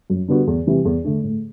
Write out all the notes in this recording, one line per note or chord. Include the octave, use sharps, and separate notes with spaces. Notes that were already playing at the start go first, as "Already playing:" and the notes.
F#2
D3 G3 B3 F#4
E2
C3 E3 G3
E2
D3 A3 D4
A2